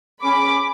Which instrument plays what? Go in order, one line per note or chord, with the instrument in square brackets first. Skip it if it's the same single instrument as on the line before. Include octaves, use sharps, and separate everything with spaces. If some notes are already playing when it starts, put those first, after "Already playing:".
[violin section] C#4 G#4 B5 D6